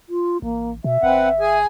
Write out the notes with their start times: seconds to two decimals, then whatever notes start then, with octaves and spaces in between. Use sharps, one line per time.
0.09 F4
0.42 A1 A#3
0.84 B2 E5
1.03 G1 C4 B4 F#5
1.40 G#4 G#5